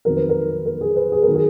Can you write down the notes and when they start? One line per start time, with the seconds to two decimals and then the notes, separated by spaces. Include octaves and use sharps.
0.05 F2 D#3 F#3 A#4
0.16 B4
0.29 A#4
0.66 A#4
0.81 G#4
0.96 B4
1.12 G#4
1.23 D#3 F#3 A#4
1.35 G#4